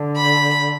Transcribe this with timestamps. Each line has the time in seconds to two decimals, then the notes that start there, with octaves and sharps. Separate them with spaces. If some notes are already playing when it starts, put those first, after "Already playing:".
Already playing: D3
0.17 B5